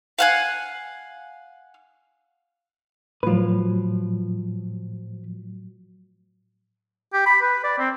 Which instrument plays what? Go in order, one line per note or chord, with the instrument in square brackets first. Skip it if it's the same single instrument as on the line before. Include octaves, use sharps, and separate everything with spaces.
[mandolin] F5 F#5 G#5
[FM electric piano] A2 F#3 [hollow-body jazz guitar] F3 B4
[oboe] G4
B5
B4
D5
C4